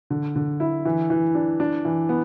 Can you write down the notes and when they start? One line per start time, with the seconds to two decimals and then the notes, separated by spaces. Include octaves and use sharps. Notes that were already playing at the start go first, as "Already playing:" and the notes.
0.10 D3
0.36 D3
0.60 E4
0.85 E3
1.10 E3
1.35 D4
1.60 D4
1.85 E3
2.09 B3